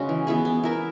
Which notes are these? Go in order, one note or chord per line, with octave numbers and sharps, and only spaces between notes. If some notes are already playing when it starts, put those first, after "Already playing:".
Already playing: C#3 G#3 C#4 F#4
E3
B3 E4 G#4
B3
E4 A#4 E5